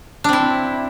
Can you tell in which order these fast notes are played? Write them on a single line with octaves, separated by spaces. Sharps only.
D4 C4 E4